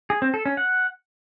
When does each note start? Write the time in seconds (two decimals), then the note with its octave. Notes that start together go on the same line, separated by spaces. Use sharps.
0.10 G#4
0.22 C4
0.34 A4
0.46 C#4
0.57 F#5